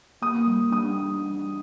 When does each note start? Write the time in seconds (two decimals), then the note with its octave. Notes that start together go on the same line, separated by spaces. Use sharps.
0.22 A#3 D#6
0.47 G3
0.71 D4 D#6